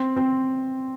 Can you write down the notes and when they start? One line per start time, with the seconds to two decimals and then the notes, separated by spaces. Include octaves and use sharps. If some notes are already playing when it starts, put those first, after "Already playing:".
Already playing: C4
0.16 C4